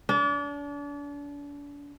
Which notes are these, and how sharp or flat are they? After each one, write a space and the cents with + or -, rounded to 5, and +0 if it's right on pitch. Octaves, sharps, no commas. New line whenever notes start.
D4 -35